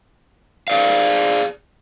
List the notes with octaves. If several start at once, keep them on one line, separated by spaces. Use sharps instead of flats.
G#4 D5 F5